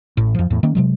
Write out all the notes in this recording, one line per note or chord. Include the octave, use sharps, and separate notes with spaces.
A1 A2
F2 F3
E2 A2
D#3 A#3 C#4
C3 F#3 G#3